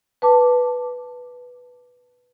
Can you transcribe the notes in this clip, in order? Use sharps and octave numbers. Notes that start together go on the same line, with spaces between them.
B4 A5 D6